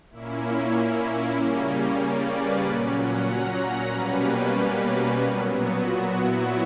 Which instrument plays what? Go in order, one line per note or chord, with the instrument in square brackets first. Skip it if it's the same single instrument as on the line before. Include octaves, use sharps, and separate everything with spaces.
[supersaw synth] A#2 A#3 C#4 E4
E4
C#3 G3 A#3 C#4
D5
B4
A#2 F#3 C#4 A#4
F#5
A#5
A#5
B2 G3 A#3 C#4 B4
A#2 F#3 B3 A#4
F#4
F#4
E4